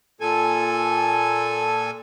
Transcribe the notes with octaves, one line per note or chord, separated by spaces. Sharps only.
A#2 A4 G#5